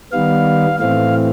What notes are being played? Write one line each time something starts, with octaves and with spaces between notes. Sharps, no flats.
D#3 G3 B3 F5
A2 E3 A3 C4 F5